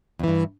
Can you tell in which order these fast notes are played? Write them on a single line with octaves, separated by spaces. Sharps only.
E2 E3 G2